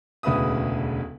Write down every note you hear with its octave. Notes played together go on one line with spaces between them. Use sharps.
E1 D2 C#3 B4 E5 D#6